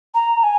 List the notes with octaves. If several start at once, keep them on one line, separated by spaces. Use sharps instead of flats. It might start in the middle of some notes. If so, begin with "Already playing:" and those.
A#5
G#5